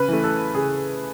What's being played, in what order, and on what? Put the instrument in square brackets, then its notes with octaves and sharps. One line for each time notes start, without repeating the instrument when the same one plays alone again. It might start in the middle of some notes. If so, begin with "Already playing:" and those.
Already playing: [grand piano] C#3 B4
E3 A3
A4
C#3 G#4